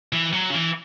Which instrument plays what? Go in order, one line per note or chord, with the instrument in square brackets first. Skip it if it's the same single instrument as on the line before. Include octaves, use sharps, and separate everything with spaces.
[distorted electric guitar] E3
F#3
C#3
E3